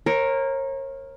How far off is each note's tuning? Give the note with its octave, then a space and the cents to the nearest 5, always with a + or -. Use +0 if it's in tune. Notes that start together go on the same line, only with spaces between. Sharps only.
A#4 +0 C#5 -35